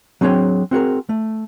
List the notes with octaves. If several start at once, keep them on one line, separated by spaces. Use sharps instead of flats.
F#3 C4 D4 G#4 C#5 G5
C4 F#4 G#4 A#4
A3